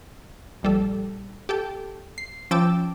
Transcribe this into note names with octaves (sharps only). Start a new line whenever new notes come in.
A#1 G3 A4
G4 A4 G5
C7
F3 C#4 G5 A5 D6 E6